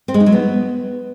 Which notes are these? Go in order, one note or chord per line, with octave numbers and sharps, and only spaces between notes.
C4
G#3
D#4
F#3
B3